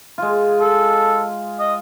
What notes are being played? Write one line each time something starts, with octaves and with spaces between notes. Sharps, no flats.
G#3 F4
A4
D#5